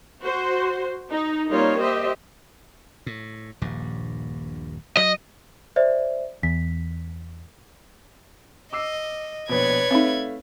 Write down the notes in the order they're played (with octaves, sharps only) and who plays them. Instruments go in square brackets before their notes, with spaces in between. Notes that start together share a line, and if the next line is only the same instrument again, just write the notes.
[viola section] F#4 C5
D#4
G3 A#3 C4 D#4 F4 C#5
G4 C5 D#5 E5
[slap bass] A2
D#1 A#1 G2
[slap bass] F#3 [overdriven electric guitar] D#5
[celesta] C5 D5 E5
[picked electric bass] E2 [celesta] B6
[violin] D#5 [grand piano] D6 E6 C7
[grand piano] A#1 B2 [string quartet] B4 C#5 [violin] D5 G#6
[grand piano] A3 E5 F5 [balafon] C4 D#4